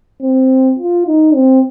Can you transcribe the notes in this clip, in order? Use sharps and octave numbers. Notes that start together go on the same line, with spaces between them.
C4
F4
D#4
C4